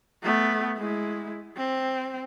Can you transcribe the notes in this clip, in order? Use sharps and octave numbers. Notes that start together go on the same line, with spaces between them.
A3 B3
G#3 E4
C4